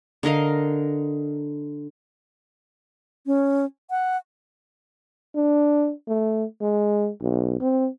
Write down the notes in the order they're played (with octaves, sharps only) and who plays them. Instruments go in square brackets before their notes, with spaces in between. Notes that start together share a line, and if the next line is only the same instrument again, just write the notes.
[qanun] D3 A#4 D#5 F5
[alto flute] C#4
F#5
[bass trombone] D4
A3
G#3
B1
C4